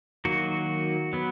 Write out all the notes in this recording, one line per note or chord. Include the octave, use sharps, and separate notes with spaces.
D#3 F#3 A#3 F#4
F#3 B3